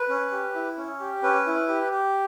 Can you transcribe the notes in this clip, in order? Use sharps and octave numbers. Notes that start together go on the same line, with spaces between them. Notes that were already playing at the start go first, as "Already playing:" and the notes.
Already playing: B4
C#4
G4
E4
C#4
G4
C#4 B4
E4
G4
G4